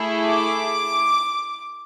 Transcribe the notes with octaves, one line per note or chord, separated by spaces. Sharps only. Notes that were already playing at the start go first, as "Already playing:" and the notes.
Already playing: A3 E4 G#4
D6